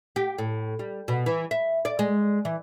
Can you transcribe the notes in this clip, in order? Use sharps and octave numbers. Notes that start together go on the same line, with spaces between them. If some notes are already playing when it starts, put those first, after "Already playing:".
G4
A2
G3
B2
E3
E5
D5
G#3
E3